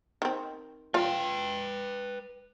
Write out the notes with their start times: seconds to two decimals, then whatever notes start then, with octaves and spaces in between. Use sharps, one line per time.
0.22 D#3 C4
0.94 F4 B4 F5 G5